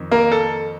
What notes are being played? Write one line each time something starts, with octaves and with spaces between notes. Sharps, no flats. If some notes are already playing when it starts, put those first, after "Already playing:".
Already playing: F2 D#3
A#3 A#4
A4